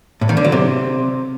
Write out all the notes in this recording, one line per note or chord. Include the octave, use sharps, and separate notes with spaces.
A2
D#3
D3
F#3
C3